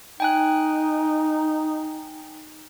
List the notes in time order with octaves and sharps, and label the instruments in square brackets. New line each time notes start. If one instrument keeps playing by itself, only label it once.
[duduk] D#4 [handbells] G5 G#5 F#6